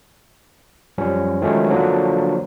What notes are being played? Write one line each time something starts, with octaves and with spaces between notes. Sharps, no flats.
F#2 F3 G3 C#4
D#3 F3 F#3 G#3 A3 C#4
D3 F3 F#3 A#3 D4